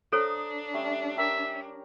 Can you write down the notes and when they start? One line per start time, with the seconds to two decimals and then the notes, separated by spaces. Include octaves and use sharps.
0.12 D4 A4 C5 C#5 F5 A#5 D#6
0.74 G3 A3 C#4
1.17 G4 A#4 E5